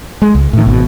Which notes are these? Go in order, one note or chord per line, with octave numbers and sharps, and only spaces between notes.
G#3
C#2
A2 D#3
G#1 B2